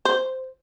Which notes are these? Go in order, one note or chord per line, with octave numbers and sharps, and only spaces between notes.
C5